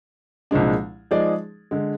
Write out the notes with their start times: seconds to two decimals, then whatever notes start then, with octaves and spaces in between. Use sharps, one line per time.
0.51 C2 A#2 F3 G#3 D4
1.11 F3 G#3 D#4 G#4 D5
1.71 D3 G#3